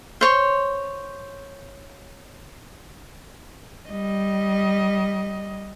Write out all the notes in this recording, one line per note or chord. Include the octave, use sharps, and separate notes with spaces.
C5 C#5 C6
G3 D#5